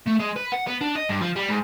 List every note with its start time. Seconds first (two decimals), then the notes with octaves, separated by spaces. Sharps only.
0.07 A3
0.20 G#3
0.37 B4
0.52 F#5
0.67 B3
0.81 D4
0.95 D#5
1.09 G2
1.21 F3
1.36 G3
1.49 G#2